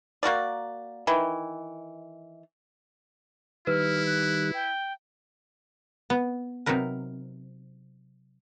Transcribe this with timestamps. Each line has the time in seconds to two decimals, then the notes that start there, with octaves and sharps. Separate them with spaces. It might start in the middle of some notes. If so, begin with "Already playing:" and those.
0.23 A#3 F#4 A#4 D5
1.07 D#3 E3
3.67 D#3 G3 E4 B4 F6
4.07 F#6
4.54 G5
6.10 B3
6.66 C3 F#3 D#4 A#4 B4